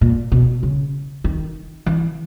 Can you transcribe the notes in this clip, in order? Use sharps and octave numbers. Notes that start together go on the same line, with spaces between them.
A#2
B2
C#3
D#3
E3